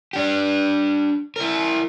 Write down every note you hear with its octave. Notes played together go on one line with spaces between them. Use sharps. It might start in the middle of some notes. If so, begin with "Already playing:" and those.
D4 G4
E4 A#4